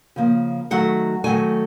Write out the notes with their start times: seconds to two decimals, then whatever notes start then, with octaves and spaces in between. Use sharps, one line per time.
0.16 C#3 F3 A#3
0.71 D#3 F#3 A3 F#5
1.24 D#3 F#3 A3 G#5